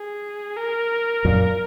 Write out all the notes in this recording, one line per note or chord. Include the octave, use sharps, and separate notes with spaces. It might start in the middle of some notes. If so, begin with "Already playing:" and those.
Already playing: G#4
A#4
F#2 A#2